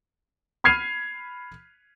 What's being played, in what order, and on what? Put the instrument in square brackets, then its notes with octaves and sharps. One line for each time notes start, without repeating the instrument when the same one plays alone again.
[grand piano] B5 F6 G#6 C7 D#7 F7